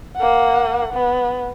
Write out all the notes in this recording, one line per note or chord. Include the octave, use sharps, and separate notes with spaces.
A#3 F#5
B3